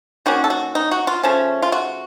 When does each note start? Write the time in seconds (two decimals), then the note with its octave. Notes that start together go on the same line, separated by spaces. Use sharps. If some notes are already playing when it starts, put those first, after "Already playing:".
0.26 D#3 A#3 C#4 F#4
0.44 A4
0.50 F#4
0.75 D#4
0.91 F#4
1.07 F4
1.23 C#3 F3 A3 C#4
1.62 F4
1.72 F#4